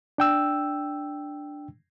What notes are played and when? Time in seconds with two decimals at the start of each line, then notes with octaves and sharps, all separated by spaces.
0.18 D4 G5 E6